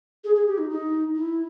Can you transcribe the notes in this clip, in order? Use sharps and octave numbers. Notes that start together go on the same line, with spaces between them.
G#4
G#4
G4
D#4
D#4
E4